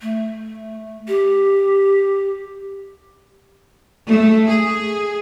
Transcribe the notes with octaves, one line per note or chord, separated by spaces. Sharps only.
A3
G4
A3
G#4